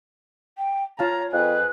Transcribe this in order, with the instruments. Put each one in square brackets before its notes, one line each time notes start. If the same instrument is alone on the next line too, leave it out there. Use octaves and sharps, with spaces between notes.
[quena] G5
[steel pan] F4 F5 A5 [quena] C#5 [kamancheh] A#5
[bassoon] F2 [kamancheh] G#4 B4 [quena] F#6